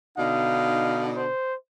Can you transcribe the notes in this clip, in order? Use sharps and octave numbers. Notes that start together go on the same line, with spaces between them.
B2 D3 D#4 F5
C5